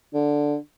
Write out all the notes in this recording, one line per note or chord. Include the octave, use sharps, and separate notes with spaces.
D3